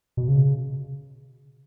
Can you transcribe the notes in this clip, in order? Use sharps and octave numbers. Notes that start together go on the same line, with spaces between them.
B2
C#3